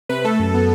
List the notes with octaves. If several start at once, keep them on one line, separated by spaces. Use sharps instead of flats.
C3 B4
A3 A4
F#2
B3